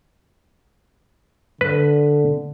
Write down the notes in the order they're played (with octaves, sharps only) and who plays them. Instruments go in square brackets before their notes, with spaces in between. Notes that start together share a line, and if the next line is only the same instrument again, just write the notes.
[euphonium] D3 [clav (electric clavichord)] B4